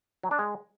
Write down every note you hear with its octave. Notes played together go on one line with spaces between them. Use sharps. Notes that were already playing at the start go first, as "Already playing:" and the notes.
F#3
D4
G#3